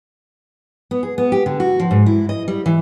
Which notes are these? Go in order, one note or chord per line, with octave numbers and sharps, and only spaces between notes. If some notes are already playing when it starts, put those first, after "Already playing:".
B3
G#4
B3
G4
D3
F#4
F3
G#2
E4
D#5
G3
E3